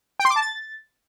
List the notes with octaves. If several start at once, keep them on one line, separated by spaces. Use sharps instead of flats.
G5
C6
D6
A5
A6